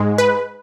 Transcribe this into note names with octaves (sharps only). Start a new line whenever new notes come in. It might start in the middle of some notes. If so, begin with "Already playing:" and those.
Already playing: G#2 G#3
B4